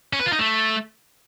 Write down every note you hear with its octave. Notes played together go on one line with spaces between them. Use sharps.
C#4
B4
F4
D#4
A3